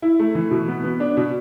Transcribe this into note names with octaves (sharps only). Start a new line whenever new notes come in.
E4
A3
E3
B2
B3
B3
D4
B2